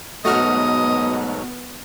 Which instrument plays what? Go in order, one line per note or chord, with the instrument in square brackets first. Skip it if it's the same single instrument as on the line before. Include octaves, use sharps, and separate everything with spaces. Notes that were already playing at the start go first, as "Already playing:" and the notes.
[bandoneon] G#2 B2 F#3 [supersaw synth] A3 F#4 F6 [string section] B3 [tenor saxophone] D#5